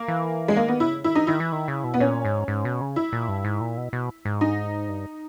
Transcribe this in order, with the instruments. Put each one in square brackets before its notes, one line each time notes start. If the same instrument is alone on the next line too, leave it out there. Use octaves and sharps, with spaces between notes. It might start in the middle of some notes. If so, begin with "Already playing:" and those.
Already playing: [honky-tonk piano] A#3
[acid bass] E3
[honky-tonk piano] G#3
[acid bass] D#3 [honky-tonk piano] A#3
[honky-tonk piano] B3
[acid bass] C#3 [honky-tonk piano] E4
[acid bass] D#3 [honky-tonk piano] E4
[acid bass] E3 [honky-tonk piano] D#4
[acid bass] D#3 [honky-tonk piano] E4
[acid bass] E3
D#3
C#3
B2
[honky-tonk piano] B3
[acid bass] A#2 [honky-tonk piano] C#4
[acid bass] G#2
G#2
B2
C#3
[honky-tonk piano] E4
[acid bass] A#2
G2
G#2
A#2
B2
B2
G#2
[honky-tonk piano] D#4
[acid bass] G2